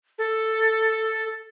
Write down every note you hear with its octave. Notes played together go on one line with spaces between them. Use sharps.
A4